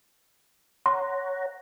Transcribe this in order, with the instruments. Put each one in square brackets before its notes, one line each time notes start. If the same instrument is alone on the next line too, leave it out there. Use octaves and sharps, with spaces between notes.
[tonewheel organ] C#5 F#5 A#5 [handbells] C6